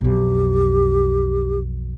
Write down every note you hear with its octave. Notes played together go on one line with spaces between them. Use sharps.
B1 F2 G4